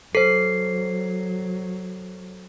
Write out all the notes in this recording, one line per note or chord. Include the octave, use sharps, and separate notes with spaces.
F#3 A4 C5 C7